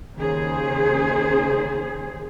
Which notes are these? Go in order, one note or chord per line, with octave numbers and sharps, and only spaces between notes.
D#2 C#3 G#4 C5